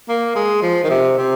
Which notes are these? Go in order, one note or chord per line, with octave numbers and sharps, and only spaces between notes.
A#3
G#3
F3
D#3
C3
C3